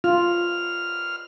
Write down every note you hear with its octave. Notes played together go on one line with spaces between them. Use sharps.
F4 F6